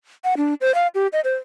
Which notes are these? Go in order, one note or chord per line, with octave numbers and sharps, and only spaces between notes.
F#5
D4
C5
F5
G4
D#5
C5